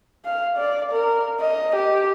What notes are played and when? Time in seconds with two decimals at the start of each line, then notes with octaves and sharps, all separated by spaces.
0.25 F5
0.57 D5
0.92 A#4
1.40 D#5
1.76 G4